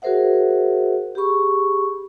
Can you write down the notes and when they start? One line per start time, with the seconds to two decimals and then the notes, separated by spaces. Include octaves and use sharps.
0.02 F#4 G#4 A#4 C5 E5 F#5
1.15 G4 G#4 B5 C#6